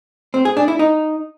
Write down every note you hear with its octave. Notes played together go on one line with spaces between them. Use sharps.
C4
G#4
D4
E4
D#4